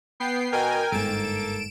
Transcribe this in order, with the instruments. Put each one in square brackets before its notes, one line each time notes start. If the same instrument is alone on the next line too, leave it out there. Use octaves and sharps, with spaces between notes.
[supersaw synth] B3 G5 C7
[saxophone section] B2 [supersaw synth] A#4 G5 G#5
[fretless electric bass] G1 G#2 [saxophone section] A#3 A4 [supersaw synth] D7 E7